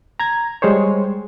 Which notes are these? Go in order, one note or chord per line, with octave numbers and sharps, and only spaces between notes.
A#5 G#6
G3 G#3 G#4 C5 C#5